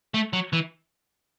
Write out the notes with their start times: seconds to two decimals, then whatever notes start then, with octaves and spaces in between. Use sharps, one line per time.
0.14 A3
0.33 F#3
0.53 E3